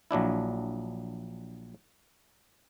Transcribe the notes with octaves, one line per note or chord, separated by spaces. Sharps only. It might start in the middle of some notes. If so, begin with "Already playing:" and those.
A#1 F#3 D4 E4